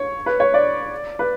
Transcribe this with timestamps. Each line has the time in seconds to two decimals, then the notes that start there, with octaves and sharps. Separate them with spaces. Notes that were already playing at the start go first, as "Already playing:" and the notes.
Already playing: C#5
0.26 B4
0.40 C#5
0.54 D5
1.19 B4